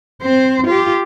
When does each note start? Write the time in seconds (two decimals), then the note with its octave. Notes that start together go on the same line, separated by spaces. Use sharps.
0.22 C4 C5
0.67 F4 G4